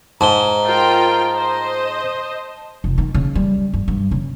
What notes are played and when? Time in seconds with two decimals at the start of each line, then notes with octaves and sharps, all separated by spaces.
0.21 G#2 A5 A#5 G7
0.65 F4 A#4 G5
1.33 C5 D#5
2.84 F1
2.98 D#3
3.14 C#3
3.35 G3
3.73 G2
3.88 G2
4.11 C#3